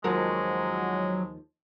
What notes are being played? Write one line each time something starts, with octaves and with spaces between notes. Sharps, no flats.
D#2 F3 F#3 G#3 A#4